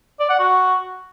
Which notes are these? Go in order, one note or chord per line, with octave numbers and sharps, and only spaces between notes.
D5
F#5
F#4